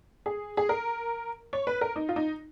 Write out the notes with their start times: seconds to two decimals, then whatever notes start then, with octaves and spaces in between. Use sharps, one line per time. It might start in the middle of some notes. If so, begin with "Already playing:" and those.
0.26 G#4
0.57 G#4
0.69 A#4
1.53 C#5
1.67 B4
1.81 A#4
1.96 D#4
2.09 F4
2.16 D#4